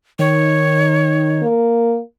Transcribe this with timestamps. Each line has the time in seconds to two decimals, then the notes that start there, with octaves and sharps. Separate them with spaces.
0.19 D#3 C#5
1.42 A#3